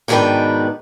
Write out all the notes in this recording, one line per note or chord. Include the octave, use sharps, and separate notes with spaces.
G#2 B2 D#3 D4 B4 G5